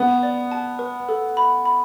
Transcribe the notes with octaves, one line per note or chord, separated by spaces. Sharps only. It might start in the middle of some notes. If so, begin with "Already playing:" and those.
Already playing: B3
D5
A5
B4
A4
B5
B5